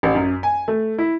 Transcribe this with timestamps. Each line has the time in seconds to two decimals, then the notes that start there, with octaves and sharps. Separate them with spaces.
0.03 A1
0.15 F#2
0.43 G#5
0.68 A3
0.98 E4